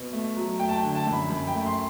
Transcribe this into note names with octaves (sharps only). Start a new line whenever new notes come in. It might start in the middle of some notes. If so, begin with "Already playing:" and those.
Already playing: B2
A3
F#3
A3 G5
A5
G5
D3
A5
F#2
B5
F#2 B5
G5
A3
C6